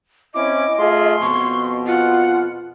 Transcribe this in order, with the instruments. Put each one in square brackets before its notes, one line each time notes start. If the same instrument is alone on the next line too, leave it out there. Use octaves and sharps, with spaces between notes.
[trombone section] C4 C#4 E4 [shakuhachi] D#5 [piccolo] D6
[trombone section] A3 F4 G#4 [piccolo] C6
[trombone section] F2 B2 [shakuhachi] C#6
[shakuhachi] F4 [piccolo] F#5